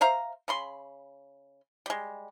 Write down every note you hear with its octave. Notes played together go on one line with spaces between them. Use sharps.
C5 E5 F5 A#5
C#3 B5 C6
G3 G#3